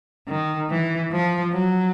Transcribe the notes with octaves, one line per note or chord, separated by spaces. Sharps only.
D#3
E3
F3
F#3